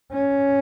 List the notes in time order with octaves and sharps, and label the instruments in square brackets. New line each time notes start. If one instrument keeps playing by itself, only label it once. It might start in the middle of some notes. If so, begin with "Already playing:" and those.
[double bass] C#4